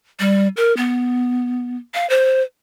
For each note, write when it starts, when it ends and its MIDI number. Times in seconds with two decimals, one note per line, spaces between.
0.20 0.48 55
0.57 0.75 70
0.77 1.76 59
1.94 2.09 77
2.10 2.43 72